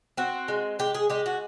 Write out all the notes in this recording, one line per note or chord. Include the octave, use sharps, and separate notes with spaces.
C4 F#4
G#3
G#3 G4
G#4
G#3 G4
F#4